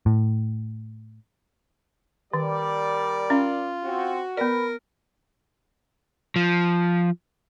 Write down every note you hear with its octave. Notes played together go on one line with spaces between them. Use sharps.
A2
D#3 G3 A#4 D5
C#4 F4
C4 F#4
B3 A#4 B4 D5
F3